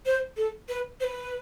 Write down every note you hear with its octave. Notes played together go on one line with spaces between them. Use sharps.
C5
A4
B4
C5
B4